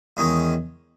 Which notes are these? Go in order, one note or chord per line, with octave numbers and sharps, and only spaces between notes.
E2 D#3 G#3 C#4